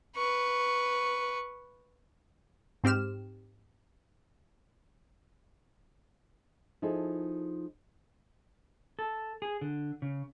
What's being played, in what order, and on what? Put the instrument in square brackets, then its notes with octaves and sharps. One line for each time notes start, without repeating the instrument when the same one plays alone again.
[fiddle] B4 C#6
[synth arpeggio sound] G#2 C4 G4 F6 E7
[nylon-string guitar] F3 D#4 E4 G#4 A4
[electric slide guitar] A4
G#4
D3
C#3